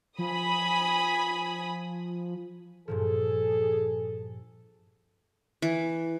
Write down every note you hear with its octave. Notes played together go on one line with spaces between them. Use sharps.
F3 G#5 B5 D#6
G2 A#2 F3 G#4 A4
E3